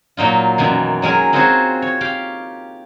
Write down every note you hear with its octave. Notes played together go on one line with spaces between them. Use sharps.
A#2 F#3 D#4 F4
F#2 B2 D#3 E3
F#3 G#3 A#4 G#5
C4 D#4 F4 F#4 G#4 C#5
C#5
G4 F5